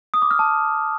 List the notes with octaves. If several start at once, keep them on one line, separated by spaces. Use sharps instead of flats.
D#6
D6
F6
A5